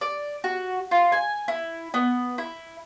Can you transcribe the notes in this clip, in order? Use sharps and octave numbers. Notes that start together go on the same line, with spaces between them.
D5
F#4
F4
G#5
E4
B3
E4